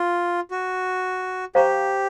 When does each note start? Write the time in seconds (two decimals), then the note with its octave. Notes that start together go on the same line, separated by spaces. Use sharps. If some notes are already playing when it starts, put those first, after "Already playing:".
Already playing: F4
0.51 F#4
1.55 G4 C5 F5 A#5 C#6